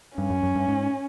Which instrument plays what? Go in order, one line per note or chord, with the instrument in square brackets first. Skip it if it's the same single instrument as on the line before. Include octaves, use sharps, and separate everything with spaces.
[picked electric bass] G2 [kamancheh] C#4
[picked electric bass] F#2
F#2
G2
G#2